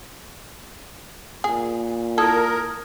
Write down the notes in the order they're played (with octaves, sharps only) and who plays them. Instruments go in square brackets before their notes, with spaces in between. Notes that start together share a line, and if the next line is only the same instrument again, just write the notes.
[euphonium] A#2 [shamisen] G#4
[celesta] E4 D#6 G#6 [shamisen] A4 [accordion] A#4